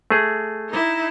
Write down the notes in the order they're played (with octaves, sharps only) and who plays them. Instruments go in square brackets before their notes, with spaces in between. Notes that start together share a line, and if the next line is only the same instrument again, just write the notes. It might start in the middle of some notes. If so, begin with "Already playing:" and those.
[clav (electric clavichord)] A3 G#4
[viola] D#4 E4